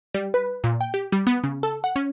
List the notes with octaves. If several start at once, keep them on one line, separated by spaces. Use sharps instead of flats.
G3
B4
A#2
G5
G4
G3
B3
C#3
A4
F#5
C#4